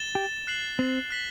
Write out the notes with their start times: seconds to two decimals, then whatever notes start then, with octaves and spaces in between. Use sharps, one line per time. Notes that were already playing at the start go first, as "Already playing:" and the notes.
Already playing: A6 E7 G7
0.15 G4
0.47 F#6 C7 F#7
0.79 C4
1.10 F#6 B6 F#7